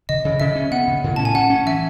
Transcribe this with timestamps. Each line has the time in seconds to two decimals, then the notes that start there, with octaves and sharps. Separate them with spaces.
0.09 C#3 D#5
0.25 C#3
0.40 C#3 E5
0.55 C#4
0.71 B3 F#5
0.87 C#3
1.04 A2
1.16 C#4 A5
1.25 G#5
1.35 C#4 F#5
1.50 C#4
1.66 E3 E5